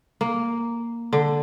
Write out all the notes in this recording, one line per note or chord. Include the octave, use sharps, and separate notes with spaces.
A#3
D3